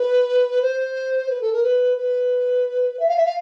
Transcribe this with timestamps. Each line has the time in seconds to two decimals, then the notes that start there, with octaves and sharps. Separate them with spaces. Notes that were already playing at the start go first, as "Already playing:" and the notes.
Already playing: B4
0.62 C5
1.29 B4
1.41 A4
1.53 A#4
1.63 B4
1.97 B4
2.99 E5
3.08 F5
3.17 E5
3.25 F5